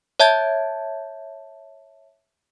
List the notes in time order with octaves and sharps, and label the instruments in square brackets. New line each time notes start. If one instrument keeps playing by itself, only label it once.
[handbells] C#5 E5 A5 G6 G#6